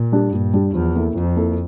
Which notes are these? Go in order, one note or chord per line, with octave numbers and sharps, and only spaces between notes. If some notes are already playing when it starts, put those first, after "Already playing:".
Already playing: A#2
G3 D4 G4
G2 A#2
G3 D4 G4
E2 F3
A#3 E4 A4
F2 F3
A#3 E4 A4